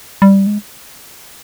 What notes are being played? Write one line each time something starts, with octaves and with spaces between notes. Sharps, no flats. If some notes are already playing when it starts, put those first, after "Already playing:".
G3
G#3